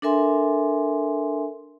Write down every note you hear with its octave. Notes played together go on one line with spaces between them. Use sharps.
D4 A4 A#4 E5 G#5 C6